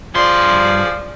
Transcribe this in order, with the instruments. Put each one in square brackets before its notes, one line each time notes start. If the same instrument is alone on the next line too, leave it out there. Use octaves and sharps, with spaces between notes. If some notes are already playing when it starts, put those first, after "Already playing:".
[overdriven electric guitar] G2 C6 [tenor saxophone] F3 [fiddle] G#4 D5